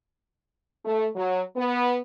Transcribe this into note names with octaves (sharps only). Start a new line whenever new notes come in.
A3
F#3
B3